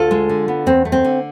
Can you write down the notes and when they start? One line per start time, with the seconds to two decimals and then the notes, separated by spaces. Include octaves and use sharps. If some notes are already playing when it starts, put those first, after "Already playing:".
Already playing: D2 F4 A4
0.11 G#3
0.29 D3
0.48 B3
0.66 E2 C4
0.85 A3
0.92 C4
1.05 D3